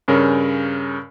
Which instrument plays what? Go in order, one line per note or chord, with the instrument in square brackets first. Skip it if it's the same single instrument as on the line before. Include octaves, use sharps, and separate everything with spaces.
[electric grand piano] G2 C#3 C#4 A#4